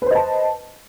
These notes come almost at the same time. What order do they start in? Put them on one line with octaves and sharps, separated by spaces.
B4 C5 D#5 A5